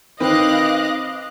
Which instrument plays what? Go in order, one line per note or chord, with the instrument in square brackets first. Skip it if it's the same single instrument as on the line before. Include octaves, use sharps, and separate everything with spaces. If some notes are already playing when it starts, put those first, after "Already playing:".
[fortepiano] D#3 C4 B4 [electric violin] D#5 [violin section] F5 D6 F#6